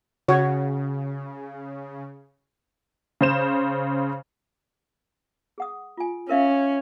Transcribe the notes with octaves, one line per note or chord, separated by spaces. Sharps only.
C#3 F#4 C#5
C#3 C5 E7
G#4 F#5 D#6
F4 G#5
C#4 A#4 E5 F5